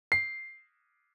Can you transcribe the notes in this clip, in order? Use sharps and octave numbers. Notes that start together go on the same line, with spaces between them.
C7